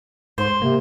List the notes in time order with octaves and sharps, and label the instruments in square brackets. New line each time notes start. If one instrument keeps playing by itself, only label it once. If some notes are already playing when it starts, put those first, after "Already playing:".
[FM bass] G#2 [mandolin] C5
[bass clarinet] C3 [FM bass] A#3